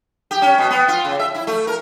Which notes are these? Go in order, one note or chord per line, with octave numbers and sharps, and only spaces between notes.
G4
C#4
B2
B3
F4
C#3
E5
E4
A3
A#4